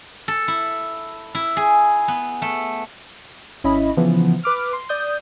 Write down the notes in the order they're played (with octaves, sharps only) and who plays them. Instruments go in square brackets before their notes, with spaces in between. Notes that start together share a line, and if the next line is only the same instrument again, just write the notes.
[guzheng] A4
E4
E4
G#4
B3
A3
[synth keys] G#1 C#4 E4 D#5 B5
C#3 E3 F3 B3
B4 D6 F6
C6
D5 D#6 G6